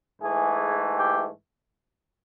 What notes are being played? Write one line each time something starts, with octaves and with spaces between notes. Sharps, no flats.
G#2 E3 A3 G#4
G4